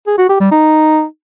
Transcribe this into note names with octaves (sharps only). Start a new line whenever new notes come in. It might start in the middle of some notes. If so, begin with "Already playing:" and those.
G#4
F#4
G4
G3
D#4